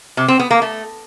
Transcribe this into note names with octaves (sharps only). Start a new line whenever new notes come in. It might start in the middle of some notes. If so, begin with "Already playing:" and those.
C3
C4
B3
A#3
A3